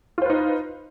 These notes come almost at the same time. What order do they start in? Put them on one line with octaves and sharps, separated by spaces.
F4 C5 B4 D#4